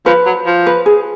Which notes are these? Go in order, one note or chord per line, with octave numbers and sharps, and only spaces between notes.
F3 B4
F#3
F3
B4
G#4